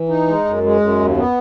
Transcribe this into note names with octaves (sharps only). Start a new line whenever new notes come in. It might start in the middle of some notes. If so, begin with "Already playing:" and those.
Already playing: E3
D#4
G#3
F#2
G#3
F#2
D#2
B3